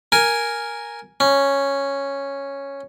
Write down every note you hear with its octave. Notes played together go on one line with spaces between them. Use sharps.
A#4 G#5
C#4